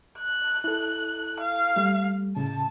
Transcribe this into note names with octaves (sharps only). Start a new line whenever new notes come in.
F#6
E4 A4
F5
G3 A3
A2 C#3 A5